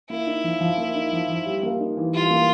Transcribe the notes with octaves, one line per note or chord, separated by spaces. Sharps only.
A#3 E4
D#4
F3
F3
A#3
D#4
F3
F3
G3
A#3
D#4
E3
G3 F4
A#3